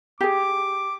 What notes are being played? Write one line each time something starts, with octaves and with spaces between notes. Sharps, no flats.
G4 G#4 D6